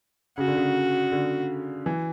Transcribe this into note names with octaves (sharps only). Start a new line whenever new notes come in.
C#3 F#4
D3
C#3
D3
E3